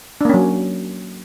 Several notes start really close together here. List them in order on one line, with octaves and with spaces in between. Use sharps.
D4 A#3 C#4 F#3